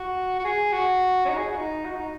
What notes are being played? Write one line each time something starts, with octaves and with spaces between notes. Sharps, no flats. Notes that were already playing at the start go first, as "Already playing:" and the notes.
Already playing: F#4
F#4
G#4
F#4
C#4
D#4
G#4
F#4
D#4
F#4
D#4